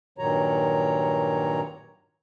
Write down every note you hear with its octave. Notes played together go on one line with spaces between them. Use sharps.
G2 A#2 D#3 F#3 C#5 A#5